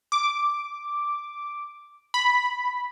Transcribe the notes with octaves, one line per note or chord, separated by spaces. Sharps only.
D6
B5